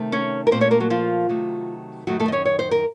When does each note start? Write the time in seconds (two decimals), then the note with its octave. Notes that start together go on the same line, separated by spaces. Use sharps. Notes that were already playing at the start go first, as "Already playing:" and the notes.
Already playing: C3 D#3 A3
0.12 C#4 C#5
0.47 A#4
0.51 A#2 A3 C4 C5
0.61 C#4 C#5
0.71 A#3 A#4
0.80 F#3 F#4
0.90 F3 F4
1.29 C3 D#3 F#3 A3
2.07 F#2 D#3 F#3 A3 F#4
2.20 A3 A4
2.28 D#5
2.32 C#4 C#5
2.45 C#5
2.59 C5
2.71 A#4